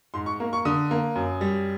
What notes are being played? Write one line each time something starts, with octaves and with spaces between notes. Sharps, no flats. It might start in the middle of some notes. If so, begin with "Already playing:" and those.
G#2 C6
C#6
A#3
C#6
D3 D#6
A#3
F#2
G3